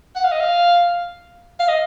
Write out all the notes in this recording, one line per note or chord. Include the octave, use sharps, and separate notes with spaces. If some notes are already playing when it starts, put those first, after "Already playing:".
F#5
F5
D#5
F5
F5
D#5